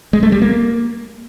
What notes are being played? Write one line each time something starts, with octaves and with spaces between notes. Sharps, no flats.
G#3
A3
G3
A#3